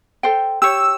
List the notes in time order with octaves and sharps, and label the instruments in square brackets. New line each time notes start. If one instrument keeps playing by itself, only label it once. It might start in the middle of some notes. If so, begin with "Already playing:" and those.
[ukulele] A4 C5 G5
[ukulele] G4 C#5 [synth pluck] E6